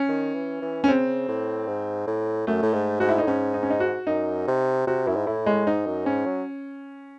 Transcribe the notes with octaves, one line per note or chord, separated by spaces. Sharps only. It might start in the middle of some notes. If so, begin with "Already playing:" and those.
Already playing: C#4
D#3
E3
E3
C#4
C#3 C4
A2
G#2
A2
F#2 A3
A2
G#2
G#2 F#4
E4
A2 D#4
G#2 C#4
D#4
C#4
D#4
F#4
F#2 D#4
C3
C3 F#4
F#2 E4
G#2
A2 E4
G#3
G#2 D#4
F#2
G#2 C#4
F#3